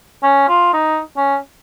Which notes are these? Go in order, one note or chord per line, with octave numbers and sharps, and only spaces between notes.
C#4
F4
D#4
C#4